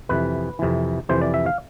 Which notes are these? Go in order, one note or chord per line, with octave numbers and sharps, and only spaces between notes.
F2 C3 E3 B4
F2 C3 E3
F2 C3 E3 C5
D5
E5
F5